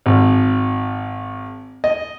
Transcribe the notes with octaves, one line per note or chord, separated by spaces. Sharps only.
G#1
D#5